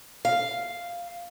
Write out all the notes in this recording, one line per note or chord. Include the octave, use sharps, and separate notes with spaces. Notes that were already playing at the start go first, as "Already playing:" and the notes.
F5